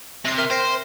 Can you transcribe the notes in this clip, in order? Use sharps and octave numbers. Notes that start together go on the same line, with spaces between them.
C3 A#6 C7
A#4 E5 F6
C5 G5 A#6 C7